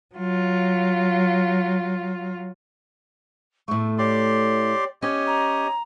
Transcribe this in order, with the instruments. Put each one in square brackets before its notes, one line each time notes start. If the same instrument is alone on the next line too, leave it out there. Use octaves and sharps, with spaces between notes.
[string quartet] F#3 F4
[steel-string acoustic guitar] A2 A3 [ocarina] C#6
[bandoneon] G4 D5 C6 [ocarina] C#5
[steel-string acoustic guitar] C#4 [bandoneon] G4 C#5 D#5
[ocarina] A#5